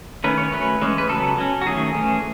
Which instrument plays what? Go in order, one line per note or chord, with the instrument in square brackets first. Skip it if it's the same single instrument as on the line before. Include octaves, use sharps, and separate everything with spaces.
[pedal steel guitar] D#3 A3 C#4 B4
C#5
F#3 A3 C#4 B4
E3 G#3 C#4
B4
C#3 F#3 B3 A4
F#3 C#4
F#4
D#3 F#3 A3 C#4 G#4
E3 A3 C#4